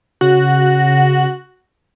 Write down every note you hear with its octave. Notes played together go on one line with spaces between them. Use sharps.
C#3 F#4